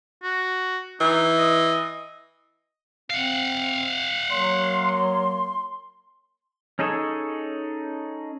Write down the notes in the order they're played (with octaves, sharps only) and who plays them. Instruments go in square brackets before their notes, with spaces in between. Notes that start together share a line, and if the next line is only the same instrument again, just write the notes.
[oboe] F#4
[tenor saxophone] E3 [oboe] D#4
[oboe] D#5
[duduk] C4 [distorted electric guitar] F5 F#5
[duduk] F#3 [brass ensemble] A#3 C#5 [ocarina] C6
[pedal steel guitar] C#4 D#4 G#4 A4 C#5